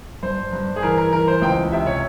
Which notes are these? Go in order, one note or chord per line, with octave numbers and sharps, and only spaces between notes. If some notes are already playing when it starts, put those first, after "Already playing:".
G2 C5
G2
G#4
E3 A#4
A#4
E3 A#4
C5
C#2 G5
C3 E5
C#5